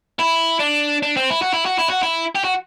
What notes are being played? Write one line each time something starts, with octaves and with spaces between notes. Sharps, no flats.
E4
D4
D4
C4
E4
F#4
E4
F#4
E4
F#4
E4
G4
F#4